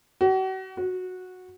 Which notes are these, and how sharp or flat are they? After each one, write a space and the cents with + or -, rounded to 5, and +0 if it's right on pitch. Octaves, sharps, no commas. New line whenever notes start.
F#4 +40
F#4 -10